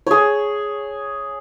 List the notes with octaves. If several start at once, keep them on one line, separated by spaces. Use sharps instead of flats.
G#4 C#5